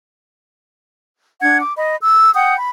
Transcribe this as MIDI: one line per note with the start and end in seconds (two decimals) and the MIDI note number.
1.41 1.59 62
1.41 1.59 78
1.41 1.59 92
1.60 1.75 86
1.76 1.95 75
1.76 1.95 83
2.01 2.32 88
2.34 2.55 78
2.34 2.55 79
2.34 2.55 87
2.34 2.55 91
2.57 2.70 83